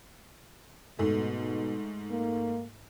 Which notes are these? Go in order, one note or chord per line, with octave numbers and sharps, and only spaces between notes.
G#2 B2 A3
A#3